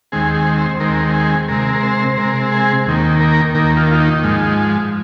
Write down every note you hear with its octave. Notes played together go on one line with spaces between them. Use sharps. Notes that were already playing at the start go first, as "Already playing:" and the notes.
D#2 D#3 G#3 C4 G#4
G#4
C5
D#2 D#3 G#3 C4 A#4
G#4
C3 G#3 C4 A#4
A#4
C5
C5
C3 G#3 C4 A#4
G#4
D#2 D#3 A#3
A#4
D#2 D#3 A#3 A#4
F4
F4
D#4
G#2 F3 G#3